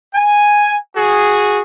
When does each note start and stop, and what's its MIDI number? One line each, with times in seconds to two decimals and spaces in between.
0.15 0.76 80
0.96 1.61 66
0.96 1.61 68